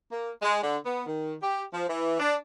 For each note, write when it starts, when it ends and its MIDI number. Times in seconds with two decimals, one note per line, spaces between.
0.12 0.31 58
0.42 0.60 56
0.62 0.77 50
0.84 1.03 59
1.06 1.34 51
1.42 1.64 67
1.73 1.88 53
1.89 2.19 52
2.20 2.35 62